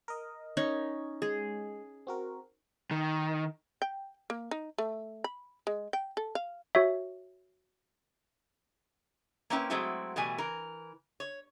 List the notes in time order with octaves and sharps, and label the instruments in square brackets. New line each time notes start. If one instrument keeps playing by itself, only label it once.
[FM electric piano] A#4 D#5
[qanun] C#4 D#4 C#5
[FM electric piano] G#3 [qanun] G#4
[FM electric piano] C4 F#4 A#4
[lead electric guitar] D#3
[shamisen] G5
A#3
D#4
A3
B5
G#3
G5
A4
F5
[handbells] F#4 C#5 E5
[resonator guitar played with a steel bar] A#3 C4 C#4 E4 B4 G5
F#3 G#3 A3 C4 E4 F#4
B2 E3 G3 A3 G#5
E3 A#4
C#5